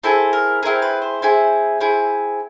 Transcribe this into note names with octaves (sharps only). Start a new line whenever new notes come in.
C4 E4 G#4 A4
A#4
C4 E4 G#4 A#4
B4
C5
C4 E4 G#4
C4 E4 G#4